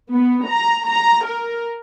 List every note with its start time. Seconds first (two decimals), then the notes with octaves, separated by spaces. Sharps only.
0.13 B3
0.46 A#5
0.85 A#5
1.25 A#4